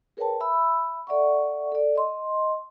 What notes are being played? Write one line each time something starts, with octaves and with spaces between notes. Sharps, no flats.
G#4 A#4 B4 C#5 G5 A5
E5 B5 E6
A4 D5 E5 F#5 C#6
A4 D5
D#5 C6